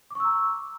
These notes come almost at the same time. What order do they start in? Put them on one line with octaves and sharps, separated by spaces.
D6 C#6 E6 A#5